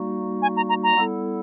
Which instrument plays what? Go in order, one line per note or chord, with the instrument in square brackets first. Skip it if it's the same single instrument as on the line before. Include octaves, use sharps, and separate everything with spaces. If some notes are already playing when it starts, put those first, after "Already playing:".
Already playing: [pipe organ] G3 A#3 D#4 F#4
[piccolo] G#5
A#5
A#5
A#5
[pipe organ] G3 B3 E4 A4